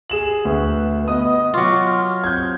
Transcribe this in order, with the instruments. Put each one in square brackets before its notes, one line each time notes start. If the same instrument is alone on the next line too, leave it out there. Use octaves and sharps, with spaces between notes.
[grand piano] G#4 E7 F#7
[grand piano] D2 [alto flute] B4
[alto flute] B3 [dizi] D#5 [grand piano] D#6
[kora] F#3 F4 [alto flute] C#6 [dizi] D6
[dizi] F6
[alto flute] C4 [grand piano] G6 G#6